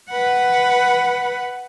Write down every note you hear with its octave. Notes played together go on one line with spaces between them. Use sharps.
B4 F#5